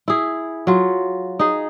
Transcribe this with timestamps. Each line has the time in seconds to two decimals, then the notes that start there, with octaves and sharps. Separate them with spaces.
0.08 E4 G#4
0.67 F#3 F4
1.39 D#4 G#4